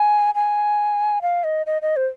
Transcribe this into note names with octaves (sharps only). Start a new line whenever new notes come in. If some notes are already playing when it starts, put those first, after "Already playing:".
Already playing: G#5
G#5
F5
D#5
D#5
D#5
C5